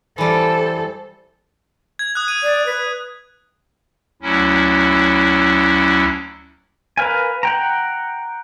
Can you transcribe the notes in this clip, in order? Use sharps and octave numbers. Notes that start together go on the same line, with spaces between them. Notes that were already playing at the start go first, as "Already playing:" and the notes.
E3 G3 A4 C5
G#6
D#6 F#6
D#7
D5
B4
D2 F#3 C#4 E4
A#4 B4 F5 G#5
F#5 G5 A#5